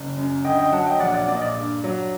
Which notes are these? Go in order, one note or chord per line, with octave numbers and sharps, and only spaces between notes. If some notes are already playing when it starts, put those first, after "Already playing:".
Already playing: F#1
F#2
D2 D#5 G5
D#5 G5
F#3 F#5 A5
D#5 G5
A#1 D5 F#5
D5 F#5
A#2 D5
D#5
D5
G2
F#3